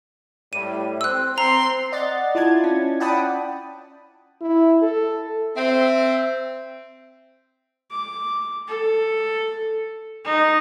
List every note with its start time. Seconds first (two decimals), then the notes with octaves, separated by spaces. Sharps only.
0.53 A2 G3 D#7
1.01 C4 E6 F#6
1.38 C4 A#5 C6
1.92 D5 D#5 F#5 A6
2.35 E4 F4 A5 G#6
2.64 C#4
3.00 D5 F#5 G5 A5 B5 D#6
4.41 E4
4.82 A4
5.56 C4 E5
7.91 D6
8.67 A4
10.25 D#4